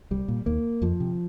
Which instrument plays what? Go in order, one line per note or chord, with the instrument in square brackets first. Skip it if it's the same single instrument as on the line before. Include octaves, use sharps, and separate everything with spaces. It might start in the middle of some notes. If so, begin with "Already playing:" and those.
[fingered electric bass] C2 G3
A#2
D#2 A#3
F2 F3
C3